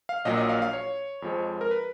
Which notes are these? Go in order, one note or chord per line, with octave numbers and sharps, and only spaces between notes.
F5
A#1 A#2 F#3 D#5
D#5
F5
F5
C#5
F2 F3 G#3
A#4
B4